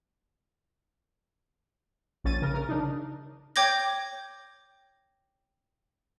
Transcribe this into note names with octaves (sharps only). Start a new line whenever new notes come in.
A#1 C#4 A6 D#7
C#3 A#4
C#3 A#4
C#3 D4 D#4
C#5 G5 D6 G6 G#6 A#6